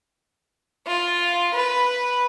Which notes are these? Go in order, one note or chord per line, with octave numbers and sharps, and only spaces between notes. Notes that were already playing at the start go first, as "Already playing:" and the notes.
F4
B4